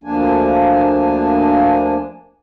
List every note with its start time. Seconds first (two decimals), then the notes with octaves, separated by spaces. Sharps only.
0.04 D2 F3 A#3 D4 G#5